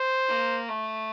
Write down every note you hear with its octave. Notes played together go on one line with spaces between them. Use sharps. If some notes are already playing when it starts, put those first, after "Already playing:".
Already playing: C5
A#3
A3